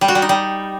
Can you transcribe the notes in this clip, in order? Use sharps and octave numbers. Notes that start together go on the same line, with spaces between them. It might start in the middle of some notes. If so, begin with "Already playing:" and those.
G3
F#4
G3
D#4
G3